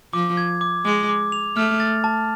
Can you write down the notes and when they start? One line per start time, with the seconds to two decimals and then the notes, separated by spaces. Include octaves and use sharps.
0.13 F3 D6
0.37 G#6
0.61 D6
0.85 G#3 D6
1.09 D6
1.32 F7
1.57 A3 F6
1.80 A6
2.04 A5